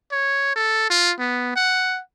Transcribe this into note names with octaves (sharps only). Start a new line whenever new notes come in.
C#5
A4
F4
B3
F#5